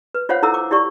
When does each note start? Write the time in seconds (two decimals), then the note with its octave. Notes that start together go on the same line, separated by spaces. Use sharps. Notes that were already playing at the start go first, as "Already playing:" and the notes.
0.15 B4
0.29 F4 C5 C#5 F5 F#5
0.43 E4 A4 A#5 E6
0.54 D6
0.71 E4 G4 D5 C#6